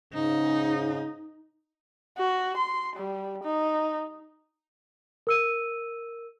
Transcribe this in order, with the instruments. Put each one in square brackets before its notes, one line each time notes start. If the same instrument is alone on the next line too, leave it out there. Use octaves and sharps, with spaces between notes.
[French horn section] G#2 C#3 [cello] D#4
[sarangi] F#4
C6
G3
D#4
[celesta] A#4 E6 D#7